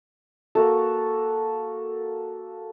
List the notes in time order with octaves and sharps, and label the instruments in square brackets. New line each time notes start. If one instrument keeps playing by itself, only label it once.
[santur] A#3 F#4 A4